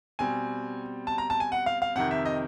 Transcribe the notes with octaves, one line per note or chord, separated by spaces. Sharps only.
B2 G3 C4 G#5
A5
A#5
A5
G#5
F#5
F5
F5
F2 C3 D#3 F#5
E5
D#5